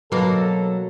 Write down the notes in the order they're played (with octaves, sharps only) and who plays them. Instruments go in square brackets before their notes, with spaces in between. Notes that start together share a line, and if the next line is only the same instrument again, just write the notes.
[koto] B2 A#3 [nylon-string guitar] F#3 [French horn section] A4